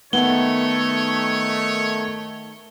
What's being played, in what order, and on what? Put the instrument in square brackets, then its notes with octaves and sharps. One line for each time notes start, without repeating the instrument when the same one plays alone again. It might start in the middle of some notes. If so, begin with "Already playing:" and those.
[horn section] D#3 A3 [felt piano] B3 [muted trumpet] C#5 [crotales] G7